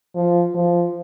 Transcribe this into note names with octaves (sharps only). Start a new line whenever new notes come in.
F3
F3